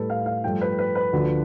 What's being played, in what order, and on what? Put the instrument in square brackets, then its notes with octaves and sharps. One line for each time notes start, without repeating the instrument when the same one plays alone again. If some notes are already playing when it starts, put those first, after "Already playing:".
Already playing: [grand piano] A2 G3 A4 B4
F5
F5
G2 F3 A3 G5
B4
B4
B4
D2 D3 F3